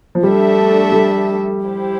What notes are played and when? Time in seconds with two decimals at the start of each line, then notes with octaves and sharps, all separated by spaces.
0.15 F3
0.23 G3 A3 D4 A4 E5
0.92 G3
1.62 E4 G4 C5